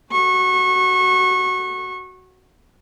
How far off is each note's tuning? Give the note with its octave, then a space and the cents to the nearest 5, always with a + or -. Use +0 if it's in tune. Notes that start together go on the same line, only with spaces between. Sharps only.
F#4 +10 C#6 -25